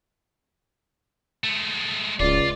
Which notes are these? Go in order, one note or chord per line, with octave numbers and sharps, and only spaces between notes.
G#3 A3
D1 C#2 F4 D5